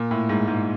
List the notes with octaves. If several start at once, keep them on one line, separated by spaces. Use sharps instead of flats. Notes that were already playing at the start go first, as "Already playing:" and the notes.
Already playing: A#2
A2
G#2
G#2